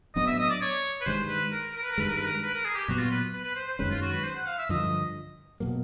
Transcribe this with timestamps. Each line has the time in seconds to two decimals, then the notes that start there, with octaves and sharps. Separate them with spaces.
0.15 A2 F#3 B3 D4 D#5
0.27 E5
0.38 D#5
0.50 D5
0.62 C#5
1.01 B4
1.06 G2 D#3 G#3 C5
1.29 B4
1.52 A#4
1.75 A#4
1.83 B4
1.92 A#4
1.98 G2 D#3 G#3 B4
2.08 A#4
2.17 B4
2.25 A#4
2.42 B4
2.54 A#4
2.65 G#4
2.76 G4
2.88 A#2 F#3 B3 F#4
2.99 F4
3.11 B4
3.33 B4
3.44 B4
3.55 C5
3.67 C5
3.79 F#2 D#3 G#3 C#4 B4
3.90 F4
4.02 F#4
4.13 B4
4.24 C5
4.35 F#5
4.46 F5
4.58 E5
4.69 G2 D3 F3 D#5
5.60 B2 F#3 A#3